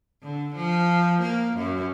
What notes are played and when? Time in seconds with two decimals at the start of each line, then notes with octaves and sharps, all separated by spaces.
0.23 D3
0.55 F3
1.21 A#3
1.57 F#2